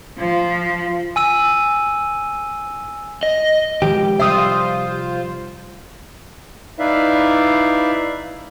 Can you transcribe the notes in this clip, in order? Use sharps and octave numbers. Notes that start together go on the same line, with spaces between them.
F3
G#5 E6 D#7
D#5
D#3 F3 G#3 G4
C3 F3 G3 F4 C5 E5 D#6
D#4 E4 B4 D5 E5 F5